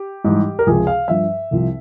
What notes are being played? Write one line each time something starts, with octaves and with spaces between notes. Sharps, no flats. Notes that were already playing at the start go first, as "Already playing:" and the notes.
Already playing: G4
G#2 E3 G3
A#4
C#2 C3 F3 G#4
F5
G2 F3 E5
C2 C3 F3